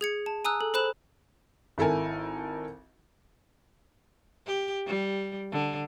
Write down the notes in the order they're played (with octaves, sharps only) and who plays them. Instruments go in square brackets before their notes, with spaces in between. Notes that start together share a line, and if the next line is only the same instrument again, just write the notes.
[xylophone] G#4 G#6 C#7
A5
G#5 A#5 D#6 E6 F#6
A4
A4 C5 B5 F#6 E7 F#7
[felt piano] G#1 E4 A4 A#4 G#5
[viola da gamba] G4
G3
D3